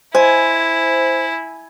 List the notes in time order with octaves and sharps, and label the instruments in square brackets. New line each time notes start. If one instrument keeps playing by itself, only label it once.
[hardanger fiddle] E4 [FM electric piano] C5 [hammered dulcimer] G#5